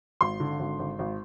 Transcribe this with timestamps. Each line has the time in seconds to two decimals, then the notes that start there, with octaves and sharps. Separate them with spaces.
0.21 G#1 C6
0.40 D3
0.60 G#1
0.79 G#1
0.99 G#1